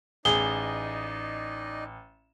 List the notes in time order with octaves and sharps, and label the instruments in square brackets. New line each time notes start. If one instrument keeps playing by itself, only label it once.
[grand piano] A1 [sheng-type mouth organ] D#4 D5 D#5 [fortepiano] G#4 [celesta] G7